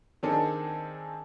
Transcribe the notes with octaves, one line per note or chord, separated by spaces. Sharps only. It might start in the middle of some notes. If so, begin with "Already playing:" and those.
D#3 C4 D4 D#4 G#4 A4